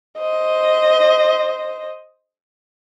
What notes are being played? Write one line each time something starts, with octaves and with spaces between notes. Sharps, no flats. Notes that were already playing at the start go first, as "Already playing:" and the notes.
C5 D#5